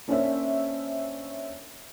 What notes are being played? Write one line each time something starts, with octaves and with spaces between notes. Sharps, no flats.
A#3 C#4 D4 C5 C#5 E5